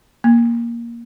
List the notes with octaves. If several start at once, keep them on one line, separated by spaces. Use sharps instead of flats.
A#3